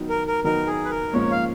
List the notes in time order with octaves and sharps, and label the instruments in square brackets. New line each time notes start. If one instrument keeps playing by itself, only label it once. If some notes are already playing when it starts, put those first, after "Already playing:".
Already playing: [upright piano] D#3 F#3 B3 D#4
[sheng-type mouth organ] A#4
A#4
[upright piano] D#3 F#3 B3 D#4 [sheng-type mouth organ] A#4
[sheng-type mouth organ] G#4
B4
A#4
[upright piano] G#2 F3 A#3 C#4 [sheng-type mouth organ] C#5
[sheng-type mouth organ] F5